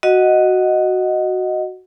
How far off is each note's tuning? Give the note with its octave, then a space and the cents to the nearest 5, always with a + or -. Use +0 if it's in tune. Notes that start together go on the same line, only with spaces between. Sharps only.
F#4 +0 D#5 +0 F#5 +0